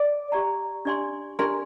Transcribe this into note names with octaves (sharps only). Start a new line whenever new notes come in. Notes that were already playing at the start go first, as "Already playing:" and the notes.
Already playing: D5
G4 D5 G5 A#5
D4 G4 D5 G#5 C6
D4 G4 A#4 D5 G#5 C6